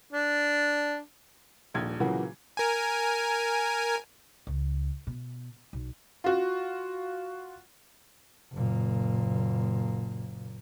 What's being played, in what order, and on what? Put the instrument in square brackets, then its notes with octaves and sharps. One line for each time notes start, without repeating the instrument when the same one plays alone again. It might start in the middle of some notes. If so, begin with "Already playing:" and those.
[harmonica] D4
[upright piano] D#1 A#1 G#6
A#2 C#3 E3 F#3 A#3 F#4
[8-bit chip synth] A#4 G#5
[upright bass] C#2
B2
B1
[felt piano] F4 F#4
[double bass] F#1 A#2